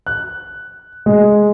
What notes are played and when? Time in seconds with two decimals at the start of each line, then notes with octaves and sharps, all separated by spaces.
0.07 F#6
1.06 G#3